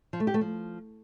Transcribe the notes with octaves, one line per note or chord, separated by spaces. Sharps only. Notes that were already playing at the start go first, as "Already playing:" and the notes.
F3
A3
G4
A3
F3